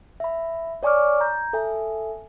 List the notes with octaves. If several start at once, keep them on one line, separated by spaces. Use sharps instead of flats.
E5 B5
C#5 D5 G#5 C#6 D6 F6
A#5 G6
A4 E5 G#5